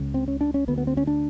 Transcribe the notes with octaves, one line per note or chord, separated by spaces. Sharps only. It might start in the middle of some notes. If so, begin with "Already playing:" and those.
Already playing: C#2 C#3
C4
C#4
D4
C#4
D2 D3 B3
B3
C4
C#4
D4